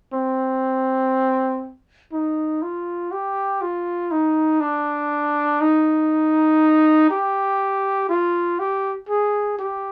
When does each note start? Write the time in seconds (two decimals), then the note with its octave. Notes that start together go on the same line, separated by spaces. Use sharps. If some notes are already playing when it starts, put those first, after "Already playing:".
0.13 C4
2.12 D#4
2.62 F4
3.12 G4
3.62 F4
4.11 D#4
4.61 D4
5.61 D#4
7.10 G4
8.09 F4
8.59 G4
9.09 G#4
9.59 G4